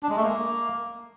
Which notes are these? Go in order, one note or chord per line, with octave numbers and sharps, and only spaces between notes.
D4
G#3
A3
A#3